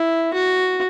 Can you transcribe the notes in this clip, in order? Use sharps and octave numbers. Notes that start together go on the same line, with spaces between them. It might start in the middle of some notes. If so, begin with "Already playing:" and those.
Already playing: E4
F#4